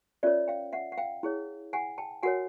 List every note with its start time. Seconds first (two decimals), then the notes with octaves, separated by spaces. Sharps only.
0.23 C#4 F4 A#4 C#5 D5 E5
0.48 F5 G5
0.73 E5 F#5
0.92 F#5
0.98 F5 G5
1.23 E4 G#4 C#5
1.73 F#5 G#5
1.98 G5 A5
2.23 F#4 A#4 C#5 F#5 G#5